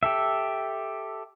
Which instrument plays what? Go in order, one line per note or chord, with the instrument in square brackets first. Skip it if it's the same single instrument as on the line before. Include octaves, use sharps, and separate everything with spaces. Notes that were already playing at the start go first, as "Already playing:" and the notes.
[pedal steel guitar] G4 A4 E5